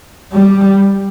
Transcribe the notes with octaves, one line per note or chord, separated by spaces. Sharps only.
G3